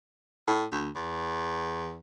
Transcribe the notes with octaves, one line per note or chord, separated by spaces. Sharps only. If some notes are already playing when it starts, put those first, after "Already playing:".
A2
D2
E2